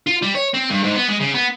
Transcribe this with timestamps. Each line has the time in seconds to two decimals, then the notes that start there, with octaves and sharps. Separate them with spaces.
0.07 F4
0.22 G3
0.35 C#5
0.54 C4
0.70 G2
0.84 G#2
0.96 B3
1.09 G#3
1.20 C#3
1.34 B3